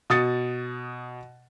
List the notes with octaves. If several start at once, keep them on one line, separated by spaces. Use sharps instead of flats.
B2 D#6 A6 C#7